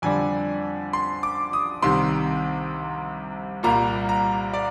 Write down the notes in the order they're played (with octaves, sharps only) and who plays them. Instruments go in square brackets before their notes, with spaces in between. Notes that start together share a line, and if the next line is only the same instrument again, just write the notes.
[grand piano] F2 D3 G3 D4 G#5
C6
D6
D#6
C2 C3 D#3 C6
C2 A#2 G3 A#3 A#5
A#5
D5